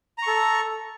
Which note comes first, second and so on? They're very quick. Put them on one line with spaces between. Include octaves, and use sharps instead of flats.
A#5 C#6 A4